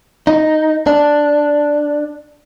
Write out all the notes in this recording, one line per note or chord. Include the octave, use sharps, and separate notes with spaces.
D#4
D4